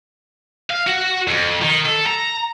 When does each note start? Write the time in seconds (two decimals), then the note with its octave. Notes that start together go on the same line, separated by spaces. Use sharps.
0.70 F5
0.87 F#4
1.27 F2
1.62 D#3
1.86 A4
2.07 A#5